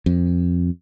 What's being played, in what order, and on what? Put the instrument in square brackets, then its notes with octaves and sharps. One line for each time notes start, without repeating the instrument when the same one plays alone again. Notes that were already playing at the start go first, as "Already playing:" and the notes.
[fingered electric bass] F2